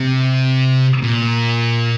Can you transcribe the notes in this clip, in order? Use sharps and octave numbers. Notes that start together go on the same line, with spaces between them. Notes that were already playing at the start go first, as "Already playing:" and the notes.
Already playing: C3
A#2